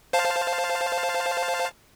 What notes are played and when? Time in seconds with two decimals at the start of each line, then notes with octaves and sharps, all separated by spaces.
0.13 C5 F5 A5